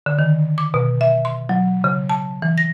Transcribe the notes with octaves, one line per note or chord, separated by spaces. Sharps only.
D3
D#3
D6
B2
E5
C6
F#3
C#3
A5
E3
A#6